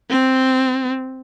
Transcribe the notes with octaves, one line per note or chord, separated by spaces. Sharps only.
C4